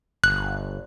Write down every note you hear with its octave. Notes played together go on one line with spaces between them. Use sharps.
G1 F#6